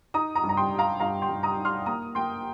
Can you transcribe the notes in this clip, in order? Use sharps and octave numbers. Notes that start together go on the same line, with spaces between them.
D#4 A#5 D#6
A#5 D#6
G2
A#5
G5 C6
G3
F5 A#5
G2 F5 A#5
G5 C6
G2
A#5 D#6
D#4
C6 F6
A#3 A#5 D#6
A#3 G5 C6